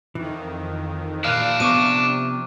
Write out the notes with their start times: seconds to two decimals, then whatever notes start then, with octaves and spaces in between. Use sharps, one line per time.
0.15 F2 D#3 E3
1.24 A#2 D4 F5 F6 F#6
1.60 C3 F3 B3 C#6 D6 D#7